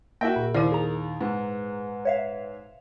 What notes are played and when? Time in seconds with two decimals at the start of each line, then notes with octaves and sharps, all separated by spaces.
0.21 A#3 F#4 A#4 E5 G5
0.36 A#2
0.55 D#2 E4 C5 D5
0.72 G#4 A#5
1.21 G#2 B4
2.05 C#5 E5 F5